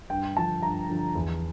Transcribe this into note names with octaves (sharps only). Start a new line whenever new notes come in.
G2 G5
D3 F3 A5
G2 A#5
D3 F3
E2